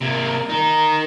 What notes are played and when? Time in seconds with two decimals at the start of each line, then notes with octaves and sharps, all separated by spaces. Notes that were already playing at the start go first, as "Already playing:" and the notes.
0.01 C3 A#3
0.49 D#4 A#4